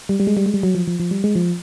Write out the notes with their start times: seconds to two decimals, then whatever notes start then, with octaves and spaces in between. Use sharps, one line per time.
0.09 G3
0.20 G3
0.27 G#3
0.37 G3
0.46 G#3
0.54 G3
0.63 F#3
0.75 F3
0.87 F3
1.00 F3
1.11 G3
1.24 G#3
1.35 F3